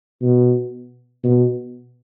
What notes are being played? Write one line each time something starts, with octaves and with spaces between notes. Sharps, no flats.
B2
B2